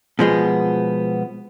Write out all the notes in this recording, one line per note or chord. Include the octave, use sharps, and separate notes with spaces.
B2 F3 G#3 B3